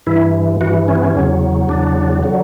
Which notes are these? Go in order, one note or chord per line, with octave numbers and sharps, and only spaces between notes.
G2 E3 E4
G2 E3 F#4
C#4
B3
C#4
E2 C#3 F#3
E2 C#3 F#3 D4
D3 F#3